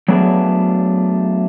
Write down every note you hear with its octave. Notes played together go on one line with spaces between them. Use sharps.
F#3 A3 B3 D4 G#4